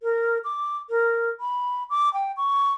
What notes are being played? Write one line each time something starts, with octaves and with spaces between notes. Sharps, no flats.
A#4
D6
A#4
B5
D6
G5
C#6